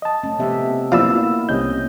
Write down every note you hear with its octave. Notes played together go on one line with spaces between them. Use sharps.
D#5 A5
A3 C#4
C3 F3 B3 E5
F3 A#3 B3 E4 D5 F5 B5 E6
C2 C3 C#4 D#5 G6